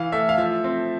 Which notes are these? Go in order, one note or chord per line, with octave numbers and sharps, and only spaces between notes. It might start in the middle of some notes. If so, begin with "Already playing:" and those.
Already playing: E3 F5
A3 E5
F5
F3 E5
C4